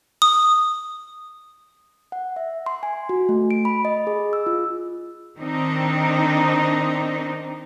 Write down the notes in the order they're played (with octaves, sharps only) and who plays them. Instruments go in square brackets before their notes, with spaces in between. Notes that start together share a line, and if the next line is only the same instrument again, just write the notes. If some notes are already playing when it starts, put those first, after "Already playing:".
[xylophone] D#6
[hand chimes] F#5
E5
C6
G#5
F#4
A3
D7
B5
D#5
G#4
E6
F4
[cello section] D#3 C4 D4 D#4